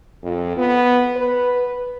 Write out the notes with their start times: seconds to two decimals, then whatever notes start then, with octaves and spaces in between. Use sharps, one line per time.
0.23 F2
0.57 B3
1.16 B4